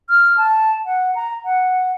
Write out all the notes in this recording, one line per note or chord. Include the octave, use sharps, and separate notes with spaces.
F6
A5
F#5
A#5
F#5